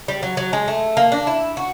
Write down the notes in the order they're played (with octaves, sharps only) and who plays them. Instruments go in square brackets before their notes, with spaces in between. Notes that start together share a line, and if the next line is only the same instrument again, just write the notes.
[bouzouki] G3
F#3
F#3
G#3
A3
A#3
D4
E4
F#4